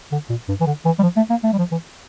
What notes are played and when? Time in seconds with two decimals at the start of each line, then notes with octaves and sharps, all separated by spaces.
0.12 D3
0.30 A#2
0.48 G2
0.61 E3
0.67 D3
0.85 E3
0.99 G3
1.03 F3
1.17 A3
1.30 A#3
1.44 A3
1.53 G3
1.58 F3
1.72 E3